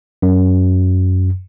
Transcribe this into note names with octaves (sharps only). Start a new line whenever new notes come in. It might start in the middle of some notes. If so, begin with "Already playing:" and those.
F#2